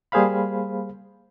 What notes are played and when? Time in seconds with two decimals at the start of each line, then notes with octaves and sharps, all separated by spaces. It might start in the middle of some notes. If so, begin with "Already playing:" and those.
0.12 G3 A#3 G#4 C5 F5 B5